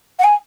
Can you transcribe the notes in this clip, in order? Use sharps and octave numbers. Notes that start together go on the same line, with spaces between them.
F#5
G#5